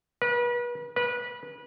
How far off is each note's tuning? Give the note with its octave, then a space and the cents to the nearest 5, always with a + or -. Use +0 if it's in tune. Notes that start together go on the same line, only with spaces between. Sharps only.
B4 -35
B4 -25